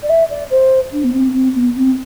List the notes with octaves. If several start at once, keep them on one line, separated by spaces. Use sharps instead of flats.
D5
E5
D5
C5
D4
B3
C4
C4
B3
C4